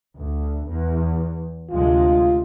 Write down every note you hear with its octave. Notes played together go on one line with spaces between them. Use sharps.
D2
E2
D2 C3 G#3 F4